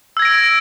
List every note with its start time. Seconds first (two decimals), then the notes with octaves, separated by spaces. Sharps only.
0.17 E6
0.19 G#6
0.22 A#6
0.25 D7